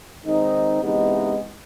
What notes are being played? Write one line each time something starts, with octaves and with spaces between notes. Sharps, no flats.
D#3 G#3 C4 D#4
C3 E3 G#3 B3 D#4